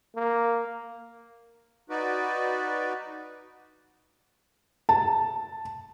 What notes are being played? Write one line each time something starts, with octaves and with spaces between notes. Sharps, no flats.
A#3
D#4 F#4 B4 D5
A5